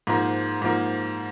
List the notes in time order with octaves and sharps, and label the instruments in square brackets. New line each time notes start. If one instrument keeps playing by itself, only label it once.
[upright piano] G#2 F3 A#3
G#2 F3 A#3